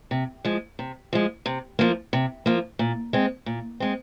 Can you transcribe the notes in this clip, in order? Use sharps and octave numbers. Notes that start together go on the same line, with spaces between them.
C3
F3 G#3
C3
F3 G#3
C3
F3 A#3
C3
F3 A#3
A#2
G#3 C4
A#2
G#3 C4